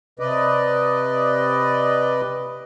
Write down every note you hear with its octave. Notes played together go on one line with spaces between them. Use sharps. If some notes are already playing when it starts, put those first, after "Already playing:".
C3 B4 D5 D#5